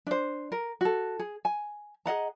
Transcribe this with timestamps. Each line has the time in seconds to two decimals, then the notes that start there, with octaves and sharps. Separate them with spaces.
0.07 D4 C5
0.52 A#4
0.81 F#4 A4
1.19 G#4
1.45 G#5
2.06 G#4 D#5 F#5 A#5